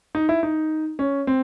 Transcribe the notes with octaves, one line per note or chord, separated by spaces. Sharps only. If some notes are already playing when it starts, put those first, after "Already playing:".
D#4
E4
D#4
C#4
C4